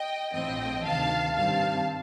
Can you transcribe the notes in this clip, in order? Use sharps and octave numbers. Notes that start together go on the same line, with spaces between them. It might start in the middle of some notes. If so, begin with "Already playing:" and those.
Already playing: D#5 G5
A#1 A2 F3 C4 D#5 G5
D2 C3 D#3 F5 A5
G2 D#3 G3 C4 F5 A5